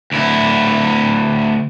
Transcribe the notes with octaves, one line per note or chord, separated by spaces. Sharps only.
D2 E4